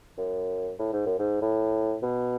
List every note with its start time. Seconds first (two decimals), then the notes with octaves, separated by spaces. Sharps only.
0.17 F#2
0.79 A2
0.93 G#2
1.06 F#2
1.19 G#2
1.41 A2
2.02 B2